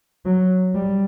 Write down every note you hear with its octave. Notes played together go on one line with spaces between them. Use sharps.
F#3
G3